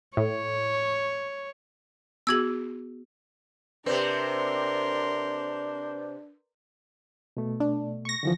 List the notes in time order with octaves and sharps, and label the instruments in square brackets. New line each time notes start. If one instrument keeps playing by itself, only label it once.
[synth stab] A2 [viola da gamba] C#5
[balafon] B3 F#4 G#4 [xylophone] E6 G#6 F#7
[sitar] C3 C4 [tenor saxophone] D4 [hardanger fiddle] A#4 C6 [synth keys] B4 D5 G6
[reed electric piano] B2 A3
[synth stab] D4
C#6 A#6
[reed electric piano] D3 E3 F3